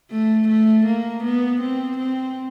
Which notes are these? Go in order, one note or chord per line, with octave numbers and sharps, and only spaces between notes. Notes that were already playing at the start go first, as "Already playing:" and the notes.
A3
A3
A#3
B3
C4
C4